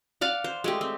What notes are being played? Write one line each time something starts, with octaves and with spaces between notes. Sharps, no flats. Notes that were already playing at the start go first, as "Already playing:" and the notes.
D5 F5 F#5
C5
G#3 A3 G4
C4